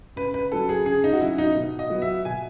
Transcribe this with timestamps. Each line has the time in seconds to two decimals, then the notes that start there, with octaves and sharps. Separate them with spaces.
0.16 C#3 B4
0.34 B4
0.51 F#3 C#4 A4
0.69 G#4
0.86 C#3 G#4
1.04 D#4
1.13 F#4
1.20 F#3 C#4 E4
1.38 D#4
1.55 B2
1.79 D#5
1.90 F#3 B3
2.02 E5
2.25 B2 G#5